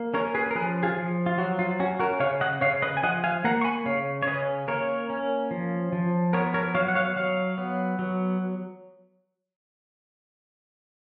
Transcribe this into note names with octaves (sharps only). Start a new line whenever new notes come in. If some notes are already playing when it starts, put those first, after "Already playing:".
Already playing: A#3
C#4 A#4 C#5
G#4 B4
A#4
F3 G#4 B4
F4 G#4
F3
F4
F#3 F#4
F4
C#4 F#4
F#4 A#4
C#3 C#5 F5
D#5 F#5
C#3 C#5 F5
B4 D#5
G#5
F3 D#5 F#5
F5 G#5
A#3 F#5 A#5
C#6
G#5 B5
C#3 C#5 F5
C#5
C#4 B4 D#5
A#3 A#4 C#5
C#4
F3
F3
B3 A#4 C#5
A#4 C#5
F#3 C#5 F5
F#5
C#5 F5
F#3 C#5 F5
B3
F#3